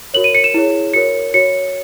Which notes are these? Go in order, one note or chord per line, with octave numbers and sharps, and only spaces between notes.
F#4 A#4 C#5 F#7
D#7
C#7
E7
E4 G#4 C#5
F#4 A#4 C#5 C#7
F#4 C#5 C#7